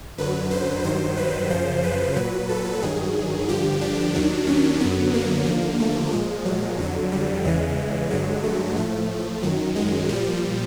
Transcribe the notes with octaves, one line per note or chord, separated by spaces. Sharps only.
F#2 D3 F#3 B4
C5
G2 D#3 F#3 C5
B4
F#2 C#3 F3 C5
B4
A#2 F#3 B4
A4
G2 D#3 F#3 G#4
G2 D3 F3 G4
D4
D#2 D#3 F#3
C#4
F#2 D3 F#3 B3
A#3
D#2 D3 F3
A3
A#2 F3 G#3
F#3
F2 D3 F#3
G3
E2 C#3 E3 G#3
G2 D3 F#3 G#3
A3
A2 F3 A3
F#2 D#3 F#3
G#3
A#2 F3 G3